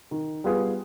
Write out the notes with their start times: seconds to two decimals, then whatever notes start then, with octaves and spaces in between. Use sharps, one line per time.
0.11 D#3
0.44 G3 B3 F4 G#4